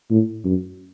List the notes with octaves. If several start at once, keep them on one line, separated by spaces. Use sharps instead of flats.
A2
F#2